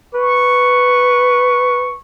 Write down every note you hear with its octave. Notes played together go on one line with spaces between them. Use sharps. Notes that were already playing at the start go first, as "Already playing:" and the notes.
B4 C#6